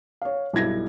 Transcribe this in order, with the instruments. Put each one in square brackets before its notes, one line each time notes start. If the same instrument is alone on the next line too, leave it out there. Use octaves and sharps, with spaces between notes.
[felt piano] C#5 F5
B1 G2 E4 G#6 A#6